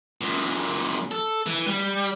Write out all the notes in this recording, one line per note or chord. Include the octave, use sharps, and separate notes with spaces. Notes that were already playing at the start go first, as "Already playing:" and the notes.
F#2 A#2
A4
E3
G3